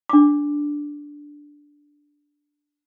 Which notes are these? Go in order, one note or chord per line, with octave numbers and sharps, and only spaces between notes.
D4 D6